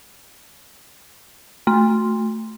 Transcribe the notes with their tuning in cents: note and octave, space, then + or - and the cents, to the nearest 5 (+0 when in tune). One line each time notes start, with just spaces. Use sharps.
A3 +0 C6 +0